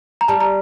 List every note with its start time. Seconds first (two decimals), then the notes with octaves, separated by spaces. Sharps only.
0.21 A#5
0.28 G3 A5
0.40 A#5